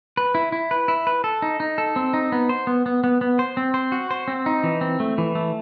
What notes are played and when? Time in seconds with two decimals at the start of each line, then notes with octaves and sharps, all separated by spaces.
0.17 B4
0.35 E4
0.52 E4
0.71 B4
0.88 E4
1.07 B4
1.24 A4
1.42 D#4
1.60 D#4
1.78 A4
1.96 C4
2.14 D#4
2.32 B3
2.49 C5
2.67 B3
2.86 B3
3.04 B3
3.21 B3
3.39 C5
3.57 C4
3.74 C5
3.92 F#4
4.11 C5
4.28 C4
4.46 D#4
4.63 E3
4.81 C4
5.00 A3
5.18 E3
5.35 A3